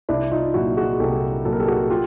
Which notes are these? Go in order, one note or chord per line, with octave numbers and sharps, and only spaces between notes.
C2 D4 E4
D#4 F4
A#2 F#3 E4 F#4
F#4 G#4
C2 G4 A4
A#2 F#3 A4
A#4
G4 A4
F#4 G#4
F4 G4